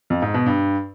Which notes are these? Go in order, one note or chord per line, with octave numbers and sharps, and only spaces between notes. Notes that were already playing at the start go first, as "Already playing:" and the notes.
F2
G#2
B2
G2